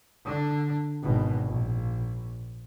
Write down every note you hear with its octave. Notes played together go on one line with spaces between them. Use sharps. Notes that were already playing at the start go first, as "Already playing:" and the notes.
D3 D4
G#1 B2
A#1